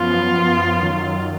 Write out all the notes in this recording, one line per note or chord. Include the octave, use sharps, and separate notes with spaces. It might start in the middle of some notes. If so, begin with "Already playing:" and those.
Already playing: F#2 F3 B3 F4
F#2 D#3 F#3